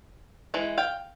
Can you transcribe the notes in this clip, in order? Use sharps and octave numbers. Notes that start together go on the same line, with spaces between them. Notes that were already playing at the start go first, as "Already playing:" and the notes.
E3 G#3
F5 G5